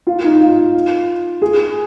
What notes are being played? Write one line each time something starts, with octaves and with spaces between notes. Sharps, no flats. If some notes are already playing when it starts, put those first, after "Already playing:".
F4
D#4
F4
G#4